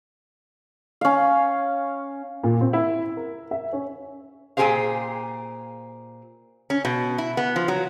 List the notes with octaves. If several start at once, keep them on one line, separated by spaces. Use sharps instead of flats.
C#4 F5
A#2
C4
E4
A#4
E5
C#4
A#2 A3 G4 G#4 C5 F5
C#4
B2
E4
B3
F3
F#3